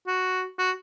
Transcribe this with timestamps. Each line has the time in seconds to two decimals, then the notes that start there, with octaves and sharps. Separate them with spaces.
0.07 F#4
0.59 F#4